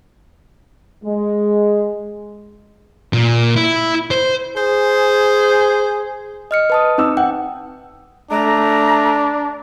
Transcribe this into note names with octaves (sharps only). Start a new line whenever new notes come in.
G#3
A#2
E4
C5
G#4 C5
D#5 F6 C#7
B4 A5 D#6
C4 D#4 E6
F#5 G5
A3 D4 A#5